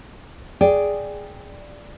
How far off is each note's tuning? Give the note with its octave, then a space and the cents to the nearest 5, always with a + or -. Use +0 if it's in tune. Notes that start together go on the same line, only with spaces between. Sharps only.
G#4 +0 D5 +0 G5 +0